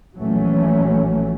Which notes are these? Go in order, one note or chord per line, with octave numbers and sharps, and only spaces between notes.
A#1 E3 F#3 A3 C#4